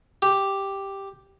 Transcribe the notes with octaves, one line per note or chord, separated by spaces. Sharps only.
G4